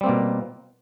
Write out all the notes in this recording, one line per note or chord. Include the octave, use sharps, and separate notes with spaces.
B2 G3 A#3 C4